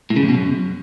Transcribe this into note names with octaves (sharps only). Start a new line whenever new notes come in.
A2
C#3
F2
B2
F#2